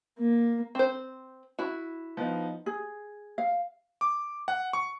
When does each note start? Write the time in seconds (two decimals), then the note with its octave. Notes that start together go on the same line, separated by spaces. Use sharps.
0.18 A#3
0.75 C4 C5
1.59 E4 F#4
2.17 F3 B3 D#4
2.66 G#4
3.38 F5
4.01 D6
4.48 F#5
4.73 C#6